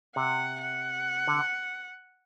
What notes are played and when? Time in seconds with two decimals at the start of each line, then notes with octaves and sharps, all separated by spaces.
0.16 C3 F#5
0.61 F#5
1.28 D3